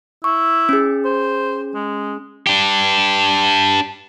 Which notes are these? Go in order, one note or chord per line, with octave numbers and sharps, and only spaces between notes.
E4 C#6
C#4 G#4
C5
G#3
D4 G4